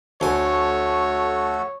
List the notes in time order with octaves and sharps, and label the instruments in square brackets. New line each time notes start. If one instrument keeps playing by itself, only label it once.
[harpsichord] D2 G#5 [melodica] A3 F#4 A4 [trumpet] C#5